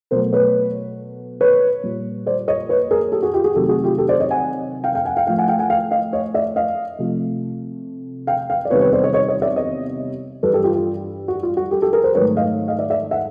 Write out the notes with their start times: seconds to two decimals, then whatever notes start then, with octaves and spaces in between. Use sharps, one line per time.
0.11 B2 F#3 A3 A#4 C5
0.33 B4 C#5
1.41 B4 C#5
1.83 A#2 G3
2.26 C5 D5
2.48 C#5 D#5
2.69 B4 C#5
2.91 G#4 A#4
3.12 G4 A4
3.23 F#4 G#4
3.34 F4 G4
3.44 F#4 G#4
3.55 C3 D#3 F#3 A3 G4 A4
3.69 F#4 G#4
3.84 F4 G4
3.98 G4 A4
4.08 C5 D5
4.20 C#5 D#5
4.31 F#5 G#5
4.84 F5 G5
4.95 F5 G5
5.05 F#5 G#5
5.17 F5 G5
5.27 A2 F3 A3 F5 G5
5.38 F#5 G#5
5.48 F5 G5
5.59 F#5 G#5
5.70 F5 G5
5.91 D#5 F5
6.13 C#5 D#5
6.34 D5 E5
6.56 D#5 F5
6.98 C3 F3 A3
8.27 F5 G5
8.50 F5 G5
8.65 D5
8.70 E2 C3 D#3 G3 B4 C#5
8.81 B4 C#5
8.93 C5 D5
9.03 C#5 D#5
9.13 C#5 D#5
9.28 C#5 D#5
9.42 D5 E5
9.56 C#5 D#5
10.43 G2 E3 G3 A4 B4
10.54 G4 A4
10.64 F4 G4
10.75 F4 G4
11.28 F#4
11.43 F4
11.57 F#4
11.71 G4 A4
11.82 G4 A4
11.93 G#4 A#4
12.04 A#4 C5
12.15 G#2 D#3 F#3 A3 B4 C#5
12.37 D#5 F5
12.68 D#5 F5
12.79 D5 E5
12.90 D5 E5
13.11 E5 F#5